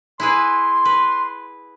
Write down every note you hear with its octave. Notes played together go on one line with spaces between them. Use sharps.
E4 G#4 B4 C6
B4